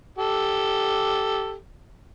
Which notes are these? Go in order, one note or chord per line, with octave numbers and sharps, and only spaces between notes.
G4 A4